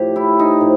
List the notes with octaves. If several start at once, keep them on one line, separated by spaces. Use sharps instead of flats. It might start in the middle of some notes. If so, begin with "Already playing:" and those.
Already playing: A2 F3 G4
E4
D#4
A2 F3